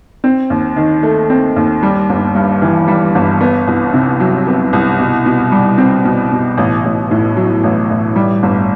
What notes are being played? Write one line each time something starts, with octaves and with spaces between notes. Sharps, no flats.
C4
D#2
D#3
A3
C4
D#2
G3
G1
G2
E3
G3
G1
B3
C2
C3
F#3
B3
C2
B2
B2
G3
C4
B2
B2
A1
A1
A2
F#3
A1
A1
G3
G1